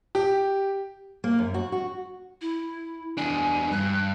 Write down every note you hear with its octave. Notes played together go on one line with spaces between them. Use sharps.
G4
A#3
F#2
F#4
F#4
E4
E2 D4 G#5
G2 F#6